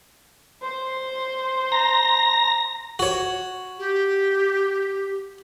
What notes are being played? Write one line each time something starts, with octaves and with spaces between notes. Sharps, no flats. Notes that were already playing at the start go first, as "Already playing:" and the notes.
C5
A#5 A#6
F#4 C#5
G4